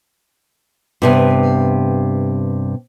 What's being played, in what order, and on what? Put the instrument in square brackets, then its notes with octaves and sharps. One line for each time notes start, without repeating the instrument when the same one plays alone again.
[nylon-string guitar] G2 C3 B3